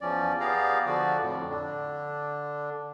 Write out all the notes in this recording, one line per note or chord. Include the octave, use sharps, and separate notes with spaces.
E2 F3 C#4 D5
B3 G4 G#4 D5 F5 A#5
D3 F3 F#4 D5
F2 A2
D3 D4